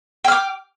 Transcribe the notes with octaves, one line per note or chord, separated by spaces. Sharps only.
G5 D6 F6